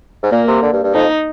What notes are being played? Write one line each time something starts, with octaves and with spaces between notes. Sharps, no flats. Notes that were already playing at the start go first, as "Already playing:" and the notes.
G#2
A#2 A#3
C3
D3
G2
G2
F2 D#4